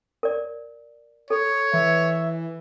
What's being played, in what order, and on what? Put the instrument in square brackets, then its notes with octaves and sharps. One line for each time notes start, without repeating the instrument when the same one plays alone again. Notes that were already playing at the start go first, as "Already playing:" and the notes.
[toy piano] A#4 D5
[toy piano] A4 [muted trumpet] C#5
[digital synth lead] E3 [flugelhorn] E5